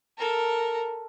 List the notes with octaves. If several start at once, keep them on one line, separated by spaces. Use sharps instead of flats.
A4 A#4